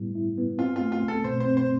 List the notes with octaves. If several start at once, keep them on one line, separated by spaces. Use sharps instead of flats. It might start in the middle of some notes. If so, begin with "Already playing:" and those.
Already playing: A2 G3 B3 E4
E4
B3
C4 F4
A3 F4
F4
C2
A4
B2 C5
C5
C4
C5